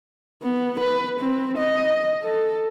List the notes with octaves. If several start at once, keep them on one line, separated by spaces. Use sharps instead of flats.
B3
B4
C4
D#5
A4